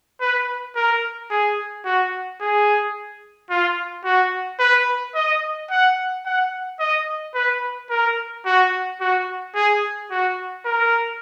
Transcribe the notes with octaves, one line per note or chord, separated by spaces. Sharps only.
B4
A#4
G#4
F#4
G#4
F4
F#4
B4
D#5
F#5
F#5
D#5
B4
A#4
F#4
F#4
G#4
F#4
A#4